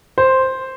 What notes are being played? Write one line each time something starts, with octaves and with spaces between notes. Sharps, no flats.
C5